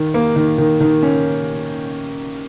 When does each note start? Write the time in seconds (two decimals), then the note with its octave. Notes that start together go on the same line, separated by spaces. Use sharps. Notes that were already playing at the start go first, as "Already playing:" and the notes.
Already playing: D#3
0.14 A#3
0.36 D#3
0.58 D#3
0.80 D#3
1.03 C#4